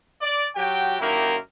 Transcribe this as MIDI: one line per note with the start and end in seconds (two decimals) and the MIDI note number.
0.21 0.46 74
0.56 1.00 54
0.56 1.00 66
0.56 1.00 67
0.56 1.00 79
1.00 1.36 42
1.00 1.36 51
1.00 1.36 58
1.00 1.36 64
1.00 1.36 67
1.00 1.36 70